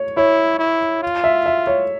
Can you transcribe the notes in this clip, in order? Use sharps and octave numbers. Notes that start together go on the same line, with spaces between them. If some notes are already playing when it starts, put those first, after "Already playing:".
Already playing: C#5
E4 C#5
E4
F4
E5
E5
C#5